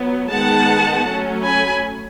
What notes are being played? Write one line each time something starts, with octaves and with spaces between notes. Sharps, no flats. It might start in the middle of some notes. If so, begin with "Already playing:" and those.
Already playing: F#3 B3
D#3 G#3 B3 F#5 A5
F#3 A3 C#4
G#5 B5